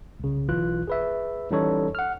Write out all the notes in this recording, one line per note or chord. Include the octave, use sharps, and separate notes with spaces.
C2 C#3
B1 E3 F4 F#6
G#4 B4 E5
E3 G3 C#4 D#4 A4 C#5
F#5 F6